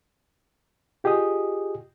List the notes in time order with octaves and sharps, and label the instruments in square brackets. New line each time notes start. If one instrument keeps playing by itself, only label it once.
[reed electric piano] F4 G4 G#4 D#5 D#6